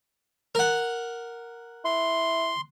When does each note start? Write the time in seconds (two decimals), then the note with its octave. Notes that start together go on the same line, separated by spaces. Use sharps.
0.55 A#4 F#5
1.85 E4 C6